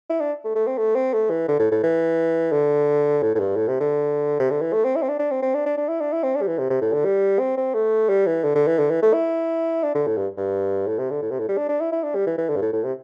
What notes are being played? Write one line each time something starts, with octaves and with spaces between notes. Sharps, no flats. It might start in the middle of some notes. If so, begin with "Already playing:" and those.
E4
D4
A3
A3
C4
A3
C4
A3
E3
D3
A2
A2
E3
D3
A2
A2
G2
A2
C3
D3
C3
D3
E3
A3
C4
E4
C4
D4
D4
C4
C4
D4
D4
D4
E4
D4
E4
C4
D4
G3
E3
C3
C3
A2
D3
G3
C4
C4
A3
G3
E3
D3
D3
E3
D3
E3
A3
E4
D4
D3
A2
G2
G2
A2
C3
D3
A2
C3
A2
G3
D4
D4
E4
E4
D4
G3
E3
E3
D3
G2
A2
A2
C3